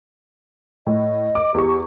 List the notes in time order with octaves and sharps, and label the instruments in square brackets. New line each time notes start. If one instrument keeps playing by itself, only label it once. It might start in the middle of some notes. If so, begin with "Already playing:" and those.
[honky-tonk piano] A2 [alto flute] D#5
[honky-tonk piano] D6
[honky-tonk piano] E2 C#6 [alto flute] G4